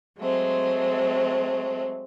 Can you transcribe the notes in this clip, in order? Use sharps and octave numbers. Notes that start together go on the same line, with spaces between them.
F#3 G#3 A3 C4